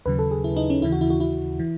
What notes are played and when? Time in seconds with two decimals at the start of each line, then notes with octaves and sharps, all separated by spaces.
0.06 D#2 C#3 F#3 B4
0.19 A4
0.31 G#4
0.44 E4
0.56 D#4
0.70 C#4
0.82 D#2 C#3 E3 E4
0.92 F#4
1.01 E4
1.10 F#4
1.20 E4
1.59 E3